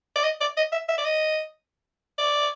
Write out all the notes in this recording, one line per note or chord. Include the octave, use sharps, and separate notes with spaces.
D5
D#5
D5
D#5
E5
E5
D5
D#5
D5